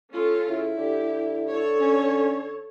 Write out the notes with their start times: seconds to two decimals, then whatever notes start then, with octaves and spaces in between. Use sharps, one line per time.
0.13 C#4 F4 A4
0.47 C#3 E4
0.77 D3 G4
1.50 A4 C#5
1.80 C#4